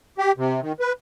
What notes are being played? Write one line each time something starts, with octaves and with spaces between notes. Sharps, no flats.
G4
C3
D#3
B4